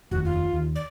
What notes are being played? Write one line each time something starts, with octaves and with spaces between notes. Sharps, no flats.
F1 D#2 F#4
F4
D#2
D5